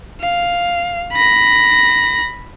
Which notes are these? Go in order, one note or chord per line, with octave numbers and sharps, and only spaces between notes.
F5
B5 A#6